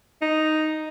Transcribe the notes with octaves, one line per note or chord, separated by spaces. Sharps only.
D#4